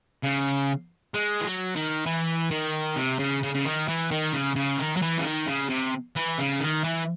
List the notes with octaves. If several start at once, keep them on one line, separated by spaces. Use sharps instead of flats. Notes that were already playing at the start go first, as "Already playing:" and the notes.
C#3
G#3
E3
F#3
D#3
E3
D#3
C3
C#3
C#3
C#3
D#3
E3
D#3
C#3
C#3
D#3
F#3
E3
C#3
D#3
C#3
C3
E3
C#3
D#3
E3